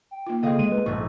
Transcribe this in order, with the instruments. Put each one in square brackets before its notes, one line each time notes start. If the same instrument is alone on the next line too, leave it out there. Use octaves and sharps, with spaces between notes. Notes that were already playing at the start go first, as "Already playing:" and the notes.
[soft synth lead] G5
[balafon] A#3 D#4 F4
[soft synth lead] C#3 [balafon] A#3 A4 F5 [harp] C4 G#4 D#5
[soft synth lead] G#3 [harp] D#7
[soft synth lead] B4
[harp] A#1 G#2 A3 [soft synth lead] C#6